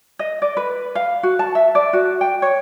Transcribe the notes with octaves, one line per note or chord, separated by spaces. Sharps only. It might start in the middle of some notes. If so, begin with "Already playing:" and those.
D#5
D5
B4
F5
F#4
A5
E5
D5
F#4
G5
C#5